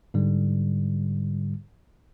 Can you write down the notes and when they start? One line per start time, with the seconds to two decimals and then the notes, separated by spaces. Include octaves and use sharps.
0.14 G#2 D3 G3